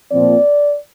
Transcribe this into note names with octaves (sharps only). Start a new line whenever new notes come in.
A#2 F3 C4 D5